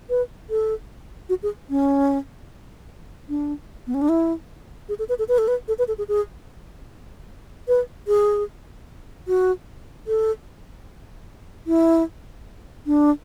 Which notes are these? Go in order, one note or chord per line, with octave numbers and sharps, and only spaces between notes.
B4
A4
F#4
G#4
C#4
D4
B3
C#4
D4
E4
G#4
A4
B4
A4
B4
A4
B4
A4
B4
A4
G#4
G#4
B4
G#4
F#4
A4
E4
D4